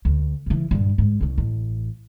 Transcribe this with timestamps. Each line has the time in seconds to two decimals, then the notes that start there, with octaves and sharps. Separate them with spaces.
0.05 D2
0.46 C#3 E3
0.71 G2 A#2
0.98 G#2
1.21 C2 C#4
1.38 A1